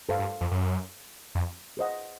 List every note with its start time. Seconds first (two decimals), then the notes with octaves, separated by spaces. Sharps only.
0.09 G2 A4 C5 F5
0.19 G2
0.41 F2
0.51 F#2
1.35 F2
1.77 G#4 C5 D#5 F#5